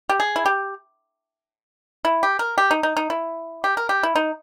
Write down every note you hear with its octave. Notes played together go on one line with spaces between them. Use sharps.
G4
G#4
E4
G4
E4
G4
A#4
G4
D#4
D#4
D#4
E4
G4
A#4
G4
E4
D#4